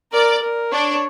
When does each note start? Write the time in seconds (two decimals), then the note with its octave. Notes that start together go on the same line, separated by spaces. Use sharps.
0.13 A#4 D5
0.42 A#4
0.72 D4 C#5